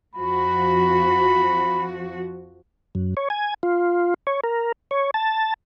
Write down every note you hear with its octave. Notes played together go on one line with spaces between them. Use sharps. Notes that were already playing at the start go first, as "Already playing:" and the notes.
F2 F3 F#4 B5
F#2
C#5
G#5
F4
C#5
A#4
C#5
A5